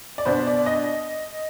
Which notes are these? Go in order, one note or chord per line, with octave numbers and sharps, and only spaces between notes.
D5
B2 B3 D4 C5
D5
D#5